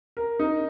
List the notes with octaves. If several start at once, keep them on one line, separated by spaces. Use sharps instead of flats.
A#4
D#4